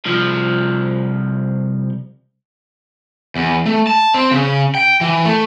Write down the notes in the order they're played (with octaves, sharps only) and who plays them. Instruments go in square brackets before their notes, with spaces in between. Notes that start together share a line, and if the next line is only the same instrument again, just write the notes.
[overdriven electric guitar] C2 F3
E2
A3
A5
C4
C#3
G5
E3
A3